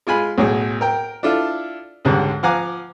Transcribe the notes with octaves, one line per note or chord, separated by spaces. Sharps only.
G#3 F4 G#5 B5
B1 A2 G#4
A#4 G5
D4 E4 F4 A4
C#2 G#2 D3 G3 G#3
F3 F5 F#5 G#5 A#5 D6